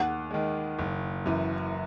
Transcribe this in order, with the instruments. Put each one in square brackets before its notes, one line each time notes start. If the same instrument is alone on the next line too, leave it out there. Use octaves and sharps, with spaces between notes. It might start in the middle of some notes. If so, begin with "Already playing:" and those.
Already playing: [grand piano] D#2 [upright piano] F#5
[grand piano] D#3 G#3
F#1
F#2 E3